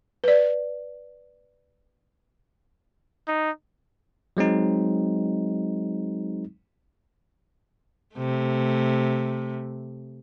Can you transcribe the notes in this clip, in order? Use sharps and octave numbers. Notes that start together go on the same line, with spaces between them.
B4 D5
D#4
F#3 G#3 C4 D#4
C3 A3